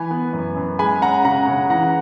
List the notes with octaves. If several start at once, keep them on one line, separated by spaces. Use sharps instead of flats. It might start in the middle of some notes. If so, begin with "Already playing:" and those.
Already playing: E3 G#5 B5
B3
F#2
F#2
G#3 G#5 B5
C#4 F#5 A#5
C#3 F#5 A#5
C#3
E3 F#5 A#5